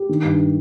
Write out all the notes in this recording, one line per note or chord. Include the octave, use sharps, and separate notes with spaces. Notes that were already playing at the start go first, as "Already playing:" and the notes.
Already playing: G4
D#3
G2